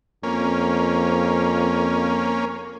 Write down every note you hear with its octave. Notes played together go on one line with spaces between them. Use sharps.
F2 A#3 C#4